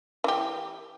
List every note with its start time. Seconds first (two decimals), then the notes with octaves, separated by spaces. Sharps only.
0.24 E3 G4